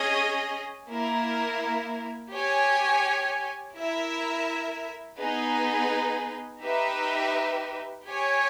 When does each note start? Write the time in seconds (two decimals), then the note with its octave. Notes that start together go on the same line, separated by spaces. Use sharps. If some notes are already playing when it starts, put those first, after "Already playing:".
Already playing: C#4 G#4 D#5
0.89 A#3 E4 A#4
2.32 G4 C#5 G#5
3.76 E4 A#4 E5
5.19 B3 D#4 G#4 B4
6.62 D#4 G4 B4 E5
8.05 G4 C#5 G#5